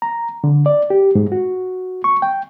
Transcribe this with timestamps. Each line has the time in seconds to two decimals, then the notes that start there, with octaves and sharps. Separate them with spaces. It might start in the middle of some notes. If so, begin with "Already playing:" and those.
0.02 A#5
0.44 D3
0.66 D5
0.90 G4
1.15 G#2
1.32 F#4
2.04 C#6
2.22 G5